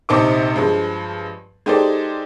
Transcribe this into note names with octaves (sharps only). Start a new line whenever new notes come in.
A#1 C3 D#4 C5 A5 D6
G2 F3 G#3
G#3 D#4 G4 A4 C5 D5